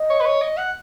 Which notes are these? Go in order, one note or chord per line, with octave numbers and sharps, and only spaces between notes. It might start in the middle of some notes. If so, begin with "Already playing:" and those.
Already playing: D#5
C#5
B4
C#5
D#5
F#5